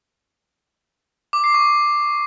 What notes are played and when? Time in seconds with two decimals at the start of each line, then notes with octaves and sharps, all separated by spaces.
1.33 D6
1.44 C7
1.54 C#6